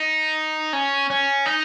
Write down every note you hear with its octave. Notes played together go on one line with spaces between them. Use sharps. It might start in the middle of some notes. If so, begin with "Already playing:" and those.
Already playing: D#4
C#4
C#4
D#4